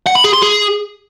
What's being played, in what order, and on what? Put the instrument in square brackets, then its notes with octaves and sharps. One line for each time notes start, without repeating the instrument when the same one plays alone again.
[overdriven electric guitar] F#5
B5
G#4
C6
G#4